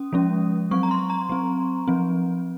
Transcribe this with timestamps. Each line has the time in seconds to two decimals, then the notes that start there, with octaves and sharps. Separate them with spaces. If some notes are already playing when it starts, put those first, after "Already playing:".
Already playing: C#4 D#6
0.13 F3 G#3 C#4
0.71 F#3 C4 C#6
0.83 A#5
0.91 C6
1.10 A#5
1.29 F#3 C4
1.88 F3 C4